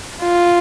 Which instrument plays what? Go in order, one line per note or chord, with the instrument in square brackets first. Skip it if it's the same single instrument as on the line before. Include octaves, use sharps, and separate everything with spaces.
[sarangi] F4